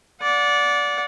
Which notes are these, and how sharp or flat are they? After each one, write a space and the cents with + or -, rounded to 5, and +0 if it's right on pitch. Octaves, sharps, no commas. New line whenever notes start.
D5 -20 F#5 -30